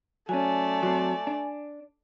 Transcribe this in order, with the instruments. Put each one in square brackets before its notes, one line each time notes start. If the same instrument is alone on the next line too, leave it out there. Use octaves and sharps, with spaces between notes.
[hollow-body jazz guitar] F#3 C#4 [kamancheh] A3 D5 [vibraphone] G#5
[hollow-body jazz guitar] F#3 C4
D4